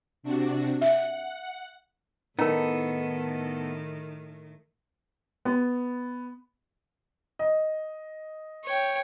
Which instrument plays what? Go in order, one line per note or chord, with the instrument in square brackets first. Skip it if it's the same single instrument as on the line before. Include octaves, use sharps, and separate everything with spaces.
[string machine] C3 D4 F#4
[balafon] E5 [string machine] F#5
[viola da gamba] A2 D#3 [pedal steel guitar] B3 A4 [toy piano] C#4 A#4 [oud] D#4
[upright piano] B3
D#5
[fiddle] C#5 G5